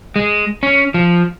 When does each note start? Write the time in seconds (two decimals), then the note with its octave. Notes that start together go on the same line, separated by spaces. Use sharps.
0.16 G#3
0.63 C#4
0.94 F3